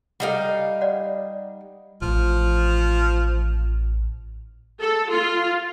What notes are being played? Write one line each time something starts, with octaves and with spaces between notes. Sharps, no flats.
G3 D#4 A4 F5 F#5
D5 F#5
A1 F3
A4
F4